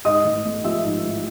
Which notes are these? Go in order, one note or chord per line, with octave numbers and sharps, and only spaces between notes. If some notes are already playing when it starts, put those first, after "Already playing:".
G#2 D#5 D#6
A1
A3
F3 E5 E6
G#2
A1